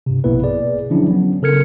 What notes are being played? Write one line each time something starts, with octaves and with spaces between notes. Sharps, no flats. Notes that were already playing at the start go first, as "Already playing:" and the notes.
G2 C3
A#1 B2 A#3 B3 E4 B4
G#4 D5
D3 F3 F#3 C#4 D4 E4
F#3 B3 C#4
C#3 A4 A#4 F6 G#6 C#7